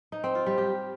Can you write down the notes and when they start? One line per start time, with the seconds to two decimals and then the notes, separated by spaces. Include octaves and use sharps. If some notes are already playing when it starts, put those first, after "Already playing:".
0.12 D#4
0.24 C4
0.35 F4
0.46 G3
0.58 G4